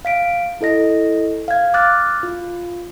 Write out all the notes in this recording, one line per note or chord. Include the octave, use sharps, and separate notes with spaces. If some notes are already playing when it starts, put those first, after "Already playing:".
F5 B6 D7
E4 A4 D#5 A#6
F5 G#6
D6 F6 F#6 A6
F4